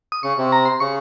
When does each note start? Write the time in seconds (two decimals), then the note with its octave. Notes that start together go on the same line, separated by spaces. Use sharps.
0.12 D#6
0.23 C#3 C#6
0.38 C3
0.52 A#5
0.65 C6
0.80 C#3 C#6